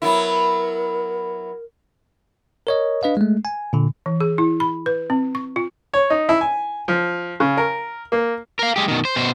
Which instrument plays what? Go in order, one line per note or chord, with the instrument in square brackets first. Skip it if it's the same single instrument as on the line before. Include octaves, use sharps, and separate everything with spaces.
[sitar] F#3 B3 E4 [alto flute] A#4
[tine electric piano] A#4 C#5 D#5
D4 B4 D#5 F5
G#3 A3
G#5
A#2 D3
[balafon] E3
G#4
E4
B5
B4
C4
C#6
F4
[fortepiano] C#5
D#4
E4
G#5
F3
C#3
A#4
A#3
[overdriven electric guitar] A#4 F5
G#3 G4
B2 D#3
C5
B2 C5